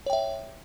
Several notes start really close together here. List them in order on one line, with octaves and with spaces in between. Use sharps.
C#5 G5 E5